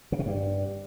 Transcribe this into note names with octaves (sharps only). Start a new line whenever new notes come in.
C#3
B2
G2